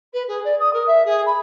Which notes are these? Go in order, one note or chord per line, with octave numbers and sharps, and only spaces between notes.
B4
G#4
D5
D#6
A#4
E5
G#4
B5